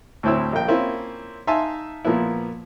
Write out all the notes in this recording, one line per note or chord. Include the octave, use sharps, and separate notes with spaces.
D2 A2 C4 E4 E6
A#1 A#3 G5
A#3 C4 C#4 E4 F4
D#4 E5 F5 G#5 A5 C6
A#2 F3 A#3 B3 E4